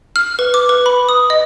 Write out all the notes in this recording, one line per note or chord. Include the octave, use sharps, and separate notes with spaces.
F6
B4
D6
B4
B5
D#6
D#5